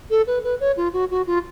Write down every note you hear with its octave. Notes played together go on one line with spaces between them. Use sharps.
A4
B4
B4
C#5
F4
F#4
F#4
F4